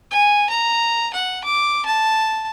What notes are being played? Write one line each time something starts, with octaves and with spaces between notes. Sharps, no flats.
G#5
A#5
F#5
D6
A5